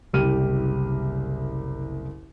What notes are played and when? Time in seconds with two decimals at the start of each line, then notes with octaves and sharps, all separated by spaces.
0.13 F#1 C2 G4 F6 D#7